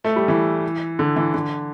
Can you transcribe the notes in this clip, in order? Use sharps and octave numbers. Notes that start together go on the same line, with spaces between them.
A3
G3
E3
D3
E3
D3